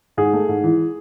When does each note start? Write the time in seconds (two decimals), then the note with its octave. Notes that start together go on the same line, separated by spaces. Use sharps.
0.17 G#2 G#4
0.33 A3
0.49 G#2
0.64 E3